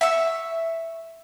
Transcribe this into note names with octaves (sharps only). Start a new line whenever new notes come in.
E5 C#6 E6